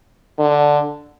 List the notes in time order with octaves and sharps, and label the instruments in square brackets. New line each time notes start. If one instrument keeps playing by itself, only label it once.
[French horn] D3